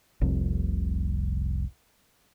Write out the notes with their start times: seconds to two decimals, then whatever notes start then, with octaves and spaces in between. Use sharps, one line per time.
0.21 F1 C2